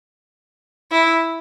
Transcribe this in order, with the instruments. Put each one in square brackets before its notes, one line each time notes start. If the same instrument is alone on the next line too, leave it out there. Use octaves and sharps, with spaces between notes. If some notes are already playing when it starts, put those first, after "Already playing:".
[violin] E4